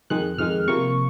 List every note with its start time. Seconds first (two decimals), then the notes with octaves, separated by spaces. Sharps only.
0.10 F2 D#3 G#3 F#6
0.38 F2 D#3 G#3 F6
0.68 C3 F3 A#3 C#6